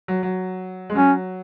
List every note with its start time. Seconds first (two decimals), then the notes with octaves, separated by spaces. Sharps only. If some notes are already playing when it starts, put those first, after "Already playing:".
0.08 F#3
0.23 F#3
0.90 G#3
0.95 F#3 C#4